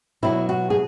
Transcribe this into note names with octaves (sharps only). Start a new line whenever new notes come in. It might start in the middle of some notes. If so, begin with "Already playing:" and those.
B2 F#3 B3 E4
F#4
G#4